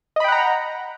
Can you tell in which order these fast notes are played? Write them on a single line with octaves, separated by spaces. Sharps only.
D#5 B5 G5 F#5 A#5